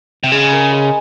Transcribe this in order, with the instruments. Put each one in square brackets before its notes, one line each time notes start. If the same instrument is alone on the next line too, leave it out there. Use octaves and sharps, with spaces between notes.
[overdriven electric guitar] C3
[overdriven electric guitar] C#3 [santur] G#3
[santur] A#4
G#3